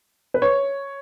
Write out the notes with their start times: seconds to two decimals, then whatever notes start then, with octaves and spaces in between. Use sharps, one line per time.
0.34 B4
0.42 C#5